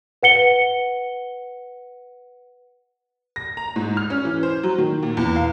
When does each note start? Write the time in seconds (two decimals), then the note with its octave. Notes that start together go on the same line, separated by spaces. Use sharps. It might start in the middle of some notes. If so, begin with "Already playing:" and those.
0.23 B4 F#5 C#7 G7
3.36 A#6
3.57 A#5
3.76 G#2
3.97 F6
4.10 C#4
4.25 E3
4.43 C5
4.63 F#3
4.78 D#3
5.03 A#2
5.17 E2
5.36 F5